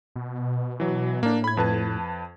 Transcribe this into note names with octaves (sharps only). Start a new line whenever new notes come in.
B2
E3 F#3
A2 A#3 D4
B5 G#6
F2 B4 A5